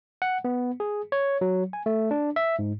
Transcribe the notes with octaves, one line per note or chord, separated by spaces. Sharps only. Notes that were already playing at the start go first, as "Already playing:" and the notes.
F#5
B3
G#4
C#5
F#3
G#5
A3
D4
E5
G#2